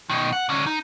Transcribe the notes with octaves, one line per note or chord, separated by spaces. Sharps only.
B2 D#3
F#5
D3 C#4
D#4